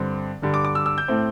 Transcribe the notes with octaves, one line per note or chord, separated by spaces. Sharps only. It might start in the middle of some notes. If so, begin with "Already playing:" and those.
Already playing: G2 D3 C4
G2 D3 G3
D6
D6
E6
E6
G6
A2 A3 C4